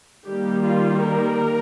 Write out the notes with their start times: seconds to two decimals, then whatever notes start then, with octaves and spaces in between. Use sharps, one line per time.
0.25 D#3 G3 A#3 G4
0.64 F4
1.03 A#4